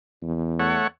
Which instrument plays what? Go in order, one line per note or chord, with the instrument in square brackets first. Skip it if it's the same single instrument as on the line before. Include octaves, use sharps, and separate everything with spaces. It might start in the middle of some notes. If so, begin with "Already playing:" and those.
[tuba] E2
[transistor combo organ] A3 C#5 F#5